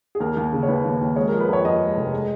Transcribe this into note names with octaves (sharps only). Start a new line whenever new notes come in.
G#4
D#2 A#4
D#2
C#3
C#5
D#2 B4
D#2
D#2
G#3 C#5
F3 A#4
B4
F2 C#5
F2 D#5
G#3
F1
G#3